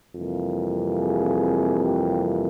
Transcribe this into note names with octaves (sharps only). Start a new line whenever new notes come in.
F2 C3 E3 G3 A#3
G#4
G4